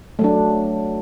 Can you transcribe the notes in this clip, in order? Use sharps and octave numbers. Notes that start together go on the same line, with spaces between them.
F#3 A3 D4